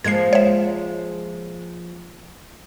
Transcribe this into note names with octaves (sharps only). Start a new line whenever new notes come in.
F3 G#3 A#3 G#6 C7
C#5 E5